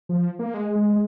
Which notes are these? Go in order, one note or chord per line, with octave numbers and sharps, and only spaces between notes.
F3
A#3
G#3
G#3
G#3